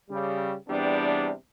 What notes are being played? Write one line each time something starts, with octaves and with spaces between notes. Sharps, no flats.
C#3 G3
E2 C3 G3 B3 D4